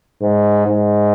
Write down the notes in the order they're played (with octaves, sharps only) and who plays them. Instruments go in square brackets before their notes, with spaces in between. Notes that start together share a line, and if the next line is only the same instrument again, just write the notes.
[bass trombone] G#2
G#2